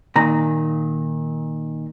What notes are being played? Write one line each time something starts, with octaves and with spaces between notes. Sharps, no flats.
A#2 D#3 A#5